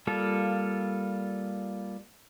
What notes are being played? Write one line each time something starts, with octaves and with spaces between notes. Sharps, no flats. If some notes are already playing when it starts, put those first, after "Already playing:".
G3 A#3 F4 A4